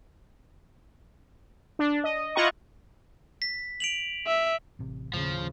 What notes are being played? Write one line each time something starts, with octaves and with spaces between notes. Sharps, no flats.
D4
D#5
E4 F4 D#5 F#5 A#5 C#6
B6
D7 F7 F#7
E5
A1 C3
D#2 A2 C#3 F3